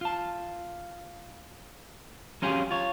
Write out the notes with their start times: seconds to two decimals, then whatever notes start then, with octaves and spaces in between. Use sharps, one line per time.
0.01 F4 A5
2.42 F#3 C#4 F4 G4 G#4
2.71 F4 C#5